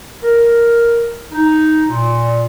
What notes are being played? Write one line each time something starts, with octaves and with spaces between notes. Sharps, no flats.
A#4
D#4
A#2